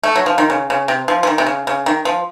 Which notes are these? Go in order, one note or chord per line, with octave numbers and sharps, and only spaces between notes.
A3
F#3
F3
D#3
C#3
C#3
C3
F3
F3
D#3
C3
C#3
C#3
D#3
F3